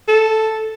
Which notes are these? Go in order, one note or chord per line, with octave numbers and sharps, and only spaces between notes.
A4